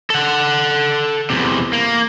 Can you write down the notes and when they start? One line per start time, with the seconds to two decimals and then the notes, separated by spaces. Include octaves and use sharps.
0.10 A4 F#5
1.30 E2 C3
1.73 A#3